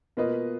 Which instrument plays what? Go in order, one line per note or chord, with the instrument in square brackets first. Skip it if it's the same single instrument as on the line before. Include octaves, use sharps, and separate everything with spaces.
[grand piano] B2 A#3 F4 B4 D#5